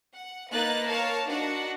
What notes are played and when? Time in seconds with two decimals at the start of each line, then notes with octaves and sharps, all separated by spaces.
0.15 F#5
0.52 A#3 D#4 B4 F#6 A6
0.87 A#4 C#5 F5 A5
1.26 D4 D#4 F#4 F#5